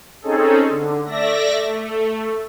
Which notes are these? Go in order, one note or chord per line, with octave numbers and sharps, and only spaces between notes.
C4 C#4 D#4 G#4 A4
D3
A3 D5 E5 A#6
A3